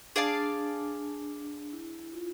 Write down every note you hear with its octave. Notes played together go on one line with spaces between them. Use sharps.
D4 G#4 D5 F5 A5
E4
F4